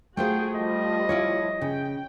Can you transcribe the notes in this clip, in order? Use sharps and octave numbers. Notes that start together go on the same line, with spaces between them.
A3 F4 F#4 G#4 C5 G5
F3 G3 D#5
E4 F4 C#5
C#3 G5